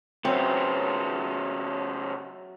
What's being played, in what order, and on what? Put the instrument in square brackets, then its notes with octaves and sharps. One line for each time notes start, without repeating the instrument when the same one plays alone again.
[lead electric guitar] C#3 B3 [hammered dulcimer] F#3 E5 [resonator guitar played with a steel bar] C4